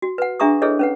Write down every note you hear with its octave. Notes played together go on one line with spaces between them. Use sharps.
F#4
B4 F#5
D4 G#4 E5 A#5 C#6 D#6
E4 G#4 A4 B4 C#5 D#5
C#4 B4 F#5